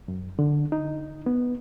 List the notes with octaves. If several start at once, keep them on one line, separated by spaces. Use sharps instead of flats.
F#2
D3
D#4
B3